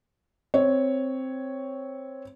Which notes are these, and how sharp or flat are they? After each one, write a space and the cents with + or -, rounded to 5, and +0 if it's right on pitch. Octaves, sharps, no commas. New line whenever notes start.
C4 +0 C#5 +0